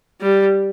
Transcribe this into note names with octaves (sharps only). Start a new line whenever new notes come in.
G3